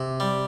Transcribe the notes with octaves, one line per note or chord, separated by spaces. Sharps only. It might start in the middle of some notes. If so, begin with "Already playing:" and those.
Already playing: C3
G3